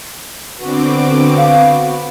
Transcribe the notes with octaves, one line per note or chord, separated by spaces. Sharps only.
D3 B3 C4 F#4 B4 D6
F5